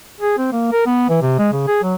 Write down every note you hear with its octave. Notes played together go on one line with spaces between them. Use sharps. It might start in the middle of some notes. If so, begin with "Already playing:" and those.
G#4
C4
A#3
A#4
B3
E3
C3
G#3
C#3
G#4
F#3